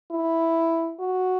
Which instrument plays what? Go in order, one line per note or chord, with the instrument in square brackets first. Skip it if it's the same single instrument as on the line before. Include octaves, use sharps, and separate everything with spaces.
[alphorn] E4
F#4